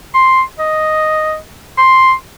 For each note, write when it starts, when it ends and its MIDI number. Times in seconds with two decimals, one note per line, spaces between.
0.15 0.42 84
0.59 1.37 75
1.78 2.13 84